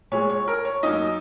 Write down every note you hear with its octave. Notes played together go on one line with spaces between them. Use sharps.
A#2 G#3 C#5
C#5
A#4
C#5
F#2 F#3 A#3 D#4 D#5